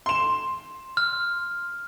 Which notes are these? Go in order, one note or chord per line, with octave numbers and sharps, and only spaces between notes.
C6 E7
F6